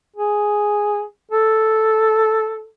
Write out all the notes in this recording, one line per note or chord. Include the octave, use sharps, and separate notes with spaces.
G#4
A4